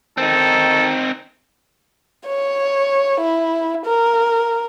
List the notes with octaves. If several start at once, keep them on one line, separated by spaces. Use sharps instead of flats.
D#3 C4 D#4 A4
C#5
E4
A#4